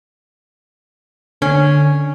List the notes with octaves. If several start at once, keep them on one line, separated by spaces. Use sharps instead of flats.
D3 C#4